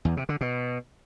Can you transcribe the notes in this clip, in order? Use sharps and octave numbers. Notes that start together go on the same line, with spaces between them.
E2
C3
D3
B2